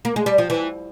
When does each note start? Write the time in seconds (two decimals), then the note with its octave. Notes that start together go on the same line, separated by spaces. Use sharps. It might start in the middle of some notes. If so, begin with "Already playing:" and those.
0.05 A#3
0.16 G#3
0.26 G3
0.38 F3
0.50 E3